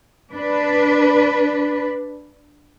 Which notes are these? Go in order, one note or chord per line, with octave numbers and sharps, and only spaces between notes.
D4 B4